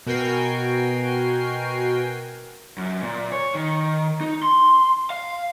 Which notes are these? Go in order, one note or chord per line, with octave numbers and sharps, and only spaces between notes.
B2 F#4 A#4 G5 G#5 C7
F#2
A#2
C#5
D#3
D#4
C6
F5